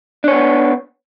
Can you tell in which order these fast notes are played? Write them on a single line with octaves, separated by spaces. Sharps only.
D4 C#5 B3